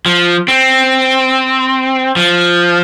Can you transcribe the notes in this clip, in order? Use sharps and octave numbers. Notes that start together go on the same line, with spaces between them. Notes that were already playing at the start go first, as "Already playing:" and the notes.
F3
C4
F3